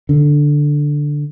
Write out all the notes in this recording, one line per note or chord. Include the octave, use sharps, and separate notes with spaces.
D3